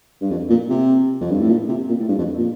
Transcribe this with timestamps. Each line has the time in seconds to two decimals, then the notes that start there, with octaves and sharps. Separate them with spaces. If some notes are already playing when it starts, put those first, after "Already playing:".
0.21 G2
0.31 F2
0.50 A#2
0.70 C3
1.21 F2
1.30 G2
1.40 A2
1.49 A#2
1.69 C3
1.89 A#2
1.99 A2
2.08 G2
2.18 F2
2.38 A#2